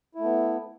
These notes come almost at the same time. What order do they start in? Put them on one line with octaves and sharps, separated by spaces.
E4 A3 B3